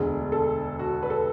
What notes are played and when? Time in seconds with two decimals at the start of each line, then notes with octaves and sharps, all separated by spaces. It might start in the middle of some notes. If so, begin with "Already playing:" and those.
Already playing: E1 D2 D3 G#4
0.32 A4
0.79 F#4
1.03 B4
1.10 A4